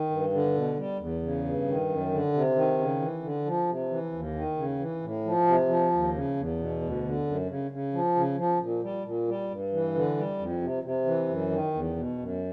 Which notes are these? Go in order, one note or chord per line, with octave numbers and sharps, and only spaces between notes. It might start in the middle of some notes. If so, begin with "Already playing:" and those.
Already playing: D#3
G2
D3
B2
G3
E2
C#3
G2
D#3
F#2
D3
C3
D#3
C#3
E3
D3
F3
C3
E3
D#2
D#3
C#3
E3
A2
F3
C3
F3
D#2
C#3
E2
B2
D2
D3
F#2
C#3
C#3
F3
C#3
F3
A#2
G3
A#2
G3
G2
E3
D3
G3
F2
C3
C3
E3
F#2
D#3
E2
B2
F#2